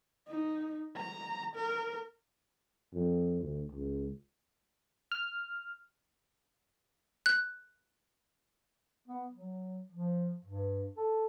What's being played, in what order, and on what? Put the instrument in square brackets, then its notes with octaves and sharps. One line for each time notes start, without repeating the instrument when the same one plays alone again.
[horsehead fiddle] D#4
A#5
A#4
[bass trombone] F2
D2
C#2
[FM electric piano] F6
[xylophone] F#6
[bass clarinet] B3
F#3
F3
G2
A4